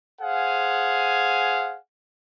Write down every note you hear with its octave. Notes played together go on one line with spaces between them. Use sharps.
G#4 C5 F5 F#5 G#5